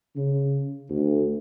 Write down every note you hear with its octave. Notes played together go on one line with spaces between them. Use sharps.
C#3
D2